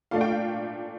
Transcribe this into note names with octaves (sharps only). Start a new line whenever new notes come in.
A#2 A3 D4 F5
G5
F5